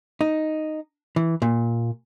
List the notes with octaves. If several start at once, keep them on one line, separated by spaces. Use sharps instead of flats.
D#4
E3
A#2